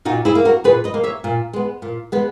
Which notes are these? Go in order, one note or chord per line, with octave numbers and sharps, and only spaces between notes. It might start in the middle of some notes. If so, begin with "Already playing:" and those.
A#2 D#4 F#4
E4 G#4
A#3
F#4 A#4
A#2 G#4 B4
B4 D#5
A#3
C#5 E5
A#2
G#3 B3
A#2
G#3 B3